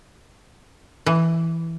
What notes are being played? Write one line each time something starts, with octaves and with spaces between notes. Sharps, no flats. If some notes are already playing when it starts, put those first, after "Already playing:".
E3